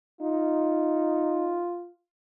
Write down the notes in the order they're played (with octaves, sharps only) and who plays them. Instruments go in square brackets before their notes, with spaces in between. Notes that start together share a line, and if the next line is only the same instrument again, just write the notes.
[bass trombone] D#4 [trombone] F4